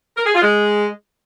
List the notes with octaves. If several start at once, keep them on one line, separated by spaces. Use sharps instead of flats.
A#4
G#4
F4
G#3